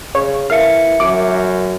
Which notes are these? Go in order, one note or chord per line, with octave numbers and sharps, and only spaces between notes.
C#3 C#5
E3 A#4 E5 F5 C#7
F#2 D6